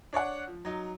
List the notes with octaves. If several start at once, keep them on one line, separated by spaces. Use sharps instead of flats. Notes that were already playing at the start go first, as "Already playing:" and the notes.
D4 C#5 D5 F#5
F3
F#3 D#4